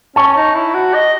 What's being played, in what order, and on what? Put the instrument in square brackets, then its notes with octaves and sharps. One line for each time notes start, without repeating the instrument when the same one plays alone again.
[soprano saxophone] C#4 [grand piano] A5 C#6
[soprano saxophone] D#4
E4
F#4
D#5